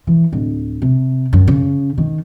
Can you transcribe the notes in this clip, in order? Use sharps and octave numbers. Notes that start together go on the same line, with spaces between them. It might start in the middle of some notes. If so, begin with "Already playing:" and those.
E3
D1
C3
F#2
C#3
D#3